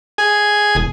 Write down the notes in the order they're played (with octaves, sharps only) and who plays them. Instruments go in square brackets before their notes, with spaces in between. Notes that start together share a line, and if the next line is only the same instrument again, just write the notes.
[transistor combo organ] G#4
[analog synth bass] E1